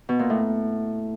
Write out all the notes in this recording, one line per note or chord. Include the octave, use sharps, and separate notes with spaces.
B2
A#2
A2